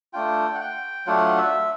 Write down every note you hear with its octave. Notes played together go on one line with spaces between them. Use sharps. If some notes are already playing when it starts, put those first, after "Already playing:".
A3 D4 F4 G5
F#5
G5
F#3 A3 D4 F4 F#5
E5